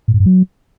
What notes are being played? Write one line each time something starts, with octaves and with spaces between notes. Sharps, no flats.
A2
G#2
G2
F#3